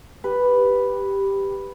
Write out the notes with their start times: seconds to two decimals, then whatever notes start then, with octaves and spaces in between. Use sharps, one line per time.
0.24 G4 B4